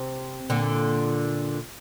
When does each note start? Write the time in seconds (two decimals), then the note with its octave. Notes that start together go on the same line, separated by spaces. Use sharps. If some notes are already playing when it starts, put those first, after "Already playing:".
Already playing: C3
0.50 A#2 D3